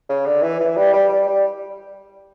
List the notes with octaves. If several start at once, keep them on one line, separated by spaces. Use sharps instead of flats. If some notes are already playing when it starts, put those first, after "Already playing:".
C#3
D3
E3
E3
G3
G3
G3
G3